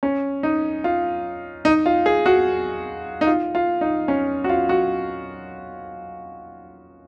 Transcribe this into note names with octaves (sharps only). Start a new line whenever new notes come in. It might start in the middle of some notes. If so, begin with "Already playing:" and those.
C#4
D#4
F4
D#4
F4
G#4
F#4
D#4
F4
F4
D#4
C#4
F#4
F4
F#4